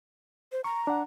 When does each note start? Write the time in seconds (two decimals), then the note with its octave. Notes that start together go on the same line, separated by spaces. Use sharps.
0.52 C5
0.64 A#5 C#6
0.87 D4 F#5